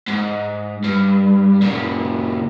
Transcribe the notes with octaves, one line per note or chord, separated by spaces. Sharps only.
G#2
G2
A#2 C#3